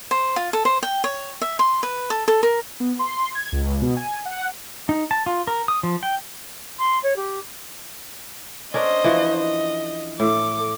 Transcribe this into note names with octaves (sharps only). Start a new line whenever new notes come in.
C5
F4
A4
C5
G5
C#5
E5
C6
B4
A4
A4
A#4
B3
C6
G#6
C#2
B2
G#5
F#5
D#4
A5
F4
A#4
D#6
F3
G5
C6
C#5
G4
C#4 D4 A#4 C5 D#5
E3 F3 F#4
D#5
A2 A4 D6